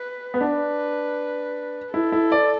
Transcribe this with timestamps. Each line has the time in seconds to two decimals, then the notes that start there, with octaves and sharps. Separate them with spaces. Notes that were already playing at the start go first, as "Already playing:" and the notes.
Already playing: B4
0.34 B3
0.41 D4 B4
1.94 E4 A4
2.12 E4
2.32 D5